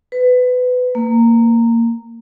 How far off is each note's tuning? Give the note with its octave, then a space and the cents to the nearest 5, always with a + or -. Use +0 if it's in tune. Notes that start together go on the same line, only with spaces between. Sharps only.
B4 +20
A#3 -15